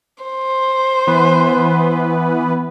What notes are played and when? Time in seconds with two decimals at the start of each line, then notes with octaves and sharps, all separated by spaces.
0.24 C5
1.07 E3 B3 B4